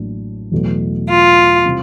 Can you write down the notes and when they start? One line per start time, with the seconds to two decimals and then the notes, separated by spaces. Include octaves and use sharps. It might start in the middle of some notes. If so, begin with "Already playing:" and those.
Already playing: A1 A2 F#3 A#3 D4
0.52 E2 B2 F#3 A3
1.08 F4
1.65 C3 E3 G3 C4